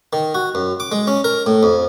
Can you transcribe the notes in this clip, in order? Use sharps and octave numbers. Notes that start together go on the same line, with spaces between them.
D#3
F#4
F#2
D6
G#3
C#4
A#4
A2
F2